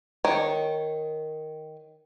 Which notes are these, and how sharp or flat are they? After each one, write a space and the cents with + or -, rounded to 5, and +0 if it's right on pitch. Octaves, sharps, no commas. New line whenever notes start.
D#3 +0 C#5 -10